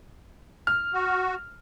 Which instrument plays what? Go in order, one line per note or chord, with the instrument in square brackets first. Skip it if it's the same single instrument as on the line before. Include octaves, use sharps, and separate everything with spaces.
[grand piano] F6
[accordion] F#4